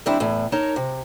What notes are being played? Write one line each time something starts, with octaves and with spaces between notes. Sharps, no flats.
D#3 G3 C4 D4 E4
E2 A2
D#4 A#4 C#5 A5
C3